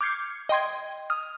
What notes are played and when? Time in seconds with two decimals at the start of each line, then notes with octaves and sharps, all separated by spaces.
0.01 D6 F6 G6 G#6 C7 C#7
0.49 D#5 G5 C6 G#6
1.10 D#6 F6